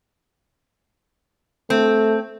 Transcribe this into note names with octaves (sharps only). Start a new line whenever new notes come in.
A3 C4